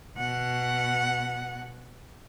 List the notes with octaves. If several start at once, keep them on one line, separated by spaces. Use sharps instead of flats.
B2 F#5